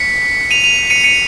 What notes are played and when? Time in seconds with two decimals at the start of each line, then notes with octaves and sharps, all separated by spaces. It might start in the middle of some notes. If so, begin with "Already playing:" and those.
Already playing: B6 C#7
0.51 D#7 F7
0.64 D#7 F7
0.90 C#7 D#7
1.04 C#7 D#7